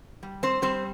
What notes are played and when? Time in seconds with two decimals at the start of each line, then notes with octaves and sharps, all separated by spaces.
0.23 G3
0.43 C4 C5
0.62 G3 C4 C5